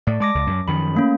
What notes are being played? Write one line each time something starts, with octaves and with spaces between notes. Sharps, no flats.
A2 D5
G#3 A5 D6 A#6
C#2
F#2
F#2 D#3 F3 B5
A3 A#3 C#4